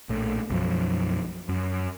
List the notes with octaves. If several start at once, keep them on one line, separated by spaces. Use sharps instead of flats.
A#1 A2
B1 F#2 F3
F#2